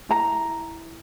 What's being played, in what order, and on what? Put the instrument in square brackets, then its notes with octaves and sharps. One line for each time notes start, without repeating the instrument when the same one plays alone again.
[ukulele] E4 A#5